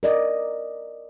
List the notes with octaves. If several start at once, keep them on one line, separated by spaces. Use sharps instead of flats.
A#4 D5 D#5